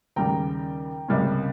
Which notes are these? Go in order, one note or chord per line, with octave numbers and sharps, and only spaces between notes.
D#2 C#3 G3 G5 A#5
C#2 C3 G3 A#3 C#4